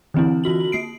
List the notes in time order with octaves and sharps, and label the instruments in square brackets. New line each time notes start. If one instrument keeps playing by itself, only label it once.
[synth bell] D3 E3 C4 D4 E4
E3 F4 F#4 F#7
A#3 C7 D7